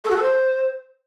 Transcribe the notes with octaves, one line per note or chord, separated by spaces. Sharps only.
A4
F#4
A4
C5